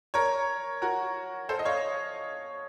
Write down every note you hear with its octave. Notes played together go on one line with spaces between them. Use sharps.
A#4 C#5
F#4 A#4
A4 C5
D#5
C#5 F5